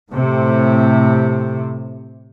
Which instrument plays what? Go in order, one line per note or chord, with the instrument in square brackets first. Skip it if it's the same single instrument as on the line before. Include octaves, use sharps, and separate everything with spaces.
[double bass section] A2 C3